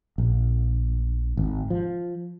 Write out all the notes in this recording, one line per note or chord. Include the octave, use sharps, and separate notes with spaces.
A#1
G#1
F3